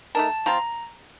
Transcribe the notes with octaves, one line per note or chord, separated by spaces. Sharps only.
A3 D#4 A#4 A5
F3 C4 F4 A#5